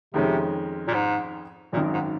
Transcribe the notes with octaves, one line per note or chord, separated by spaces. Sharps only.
F2 C3 D#3 G#3 C#4
A#2
G#2
G#1 F#2 A#2 D#3
G#2